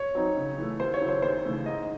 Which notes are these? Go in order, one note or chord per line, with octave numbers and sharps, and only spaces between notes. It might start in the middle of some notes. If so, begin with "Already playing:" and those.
Already playing: C#5
F#3 C4 D#4
C#3
E3 A3
D#2 C5
C#5
C#3 F#3 C#4 E4
C5
D#2 C5
C#3 E3 A3
G#2 D#5